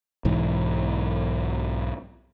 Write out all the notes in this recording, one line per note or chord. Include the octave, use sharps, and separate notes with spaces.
B1 G#2 E3